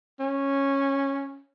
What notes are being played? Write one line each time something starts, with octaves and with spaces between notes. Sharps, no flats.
C#4